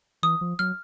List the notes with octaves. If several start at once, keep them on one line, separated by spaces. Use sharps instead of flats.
E3 D#6
F3
F#3 F6